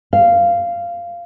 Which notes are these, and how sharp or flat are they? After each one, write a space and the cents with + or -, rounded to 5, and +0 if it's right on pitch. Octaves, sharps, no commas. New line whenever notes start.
F5 -10